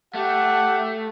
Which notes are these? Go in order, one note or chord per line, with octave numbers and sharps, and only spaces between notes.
A3 G4 F#5